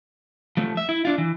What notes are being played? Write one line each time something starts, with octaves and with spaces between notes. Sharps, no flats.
F3 A3
E5
E4
D4 F4
E3